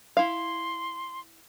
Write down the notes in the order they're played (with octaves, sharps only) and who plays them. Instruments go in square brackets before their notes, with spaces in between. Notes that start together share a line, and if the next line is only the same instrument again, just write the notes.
[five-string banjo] E4 F5 [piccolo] C6